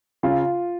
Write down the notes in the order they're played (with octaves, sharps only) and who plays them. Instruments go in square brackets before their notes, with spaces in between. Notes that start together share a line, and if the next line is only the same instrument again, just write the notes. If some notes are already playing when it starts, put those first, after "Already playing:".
[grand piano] C#3 [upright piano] F4